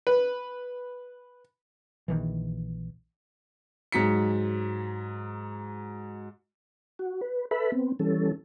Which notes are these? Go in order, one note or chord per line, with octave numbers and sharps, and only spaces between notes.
B4
A#1 D#3 E3
G#2 F#3 B6 C#7
F#4
B4
A4 B4 E5 B5
B3 C4
E3 G3 C#4 A4